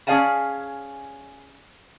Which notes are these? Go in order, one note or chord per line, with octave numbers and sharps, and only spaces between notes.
C#4 G#4 D5 F5 G#5 A5